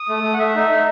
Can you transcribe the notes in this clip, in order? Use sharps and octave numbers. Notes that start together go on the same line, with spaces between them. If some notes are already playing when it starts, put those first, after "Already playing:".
Already playing: D#6
A3
A3
F#5
A3 E5
D#4
D#4